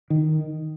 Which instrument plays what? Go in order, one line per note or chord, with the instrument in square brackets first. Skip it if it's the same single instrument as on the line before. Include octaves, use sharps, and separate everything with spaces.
[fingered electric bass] D#3